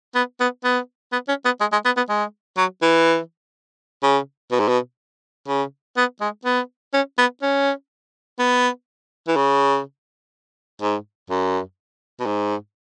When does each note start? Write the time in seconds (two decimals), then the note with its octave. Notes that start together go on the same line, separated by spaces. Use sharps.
0.15 B3
0.40 B3
0.64 B3
1.12 B3
1.28 C#4
1.45 B3
1.60 G#3
1.72 G#3
1.85 B3
1.97 B3
2.09 G#3
2.57 F#3
2.82 E3
4.03 C#3
4.51 B2
4.60 G#2
4.68 B2
5.48 C#3
5.97 B3
6.21 G#3
6.45 B3
6.94 C#4
7.18 B3
7.42 C#4
8.39 B3
9.28 E3
9.36 C#3
10.81 G#2
11.30 F#2
12.20 B2
12.26 G#2